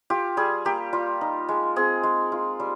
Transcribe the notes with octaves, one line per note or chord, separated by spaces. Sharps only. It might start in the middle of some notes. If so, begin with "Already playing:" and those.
F4 G4
G3 G#4
A#3 G4
G3 F4
D#4
G#3
C4 G#4
G#3
F4
G3